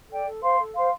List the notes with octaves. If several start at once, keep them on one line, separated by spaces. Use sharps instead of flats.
A4 D5 G5
A4
C5 F5 C6
A4
C5 F5 C6